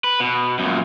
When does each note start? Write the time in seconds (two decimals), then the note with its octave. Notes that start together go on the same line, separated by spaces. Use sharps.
0.04 B4
0.20 B2
0.59 F#2 A#2